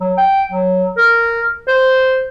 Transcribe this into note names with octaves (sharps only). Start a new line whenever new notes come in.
F#3
G5
F#3
A#4
C5